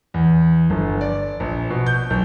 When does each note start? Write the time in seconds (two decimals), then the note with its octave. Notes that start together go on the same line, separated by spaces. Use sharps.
0.14 E2
0.70 G1
1.01 D5
1.40 A#1
1.70 B2
1.86 G6
2.10 B1